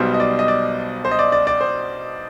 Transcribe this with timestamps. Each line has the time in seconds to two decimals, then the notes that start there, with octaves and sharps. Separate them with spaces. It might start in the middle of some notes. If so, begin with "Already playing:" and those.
Already playing: B1 B2 G3 C5
0.14 D#5
0.20 D5
0.39 D#5
0.48 D5
1.05 C5
1.11 D#5
1.19 D5
1.32 D5
1.47 D5
1.61 C5